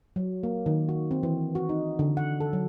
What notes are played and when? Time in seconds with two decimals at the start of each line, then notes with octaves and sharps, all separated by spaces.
0.16 F#3
0.43 A#3
0.66 D#3
0.89 F#4
1.11 C4
1.23 E3
1.55 F#4
1.69 D#4
1.99 D3
2.17 F#5
2.40 A4
2.53 F#3